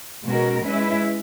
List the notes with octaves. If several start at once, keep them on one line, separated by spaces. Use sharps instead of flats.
B2 G#3 C#4 F#4 A#4
G#3 C#4 E4 B4 E5